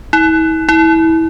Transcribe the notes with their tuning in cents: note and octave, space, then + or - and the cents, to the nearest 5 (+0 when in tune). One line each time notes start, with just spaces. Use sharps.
E4 -45
E4 -25